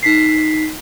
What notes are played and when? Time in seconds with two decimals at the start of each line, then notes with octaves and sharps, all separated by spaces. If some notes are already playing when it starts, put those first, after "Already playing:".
0.03 D#4 B6 C7